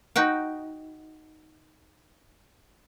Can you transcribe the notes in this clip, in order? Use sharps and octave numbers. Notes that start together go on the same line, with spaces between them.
D#4 F#4 F#5 G5